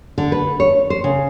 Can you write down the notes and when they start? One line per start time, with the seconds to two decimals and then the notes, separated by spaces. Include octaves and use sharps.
0.18 D3
0.32 B4
0.60 C#5
0.90 C5
1.04 C#3